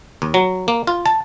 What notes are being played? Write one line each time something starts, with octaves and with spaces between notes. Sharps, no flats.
D#2
F#3
A#3
F4
A5